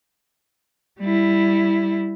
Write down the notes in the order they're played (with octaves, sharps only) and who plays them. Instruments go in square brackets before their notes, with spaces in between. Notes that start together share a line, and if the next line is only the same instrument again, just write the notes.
[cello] G3 E4